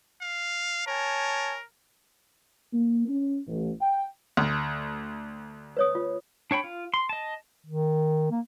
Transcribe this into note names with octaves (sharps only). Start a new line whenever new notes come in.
F5
A#4 C#5 G#5 A5
A#3
C#4
A1
G5
D2
B4 C#5 D#6
F4
D4 C#5 G5 B5
F4
C6
D#5 A5
D#3
A#3